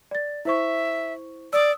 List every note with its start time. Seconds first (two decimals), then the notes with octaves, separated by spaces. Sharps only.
0.11 D5 A6
0.45 E4 C5 E5 C#6
1.53 D5 D#6 E6